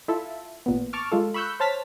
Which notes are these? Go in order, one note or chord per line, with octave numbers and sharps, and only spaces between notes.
E4 F4 A4 E5
A1 A#2 B3
A5 C#6 D6 F6
G#3 F4 A4
B5 C#6 E6 F#6 G6
C5 C#5 A5 F6 A6 B6